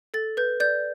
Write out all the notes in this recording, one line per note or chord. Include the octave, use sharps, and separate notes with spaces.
A4 A6
B4 G6
D5 G6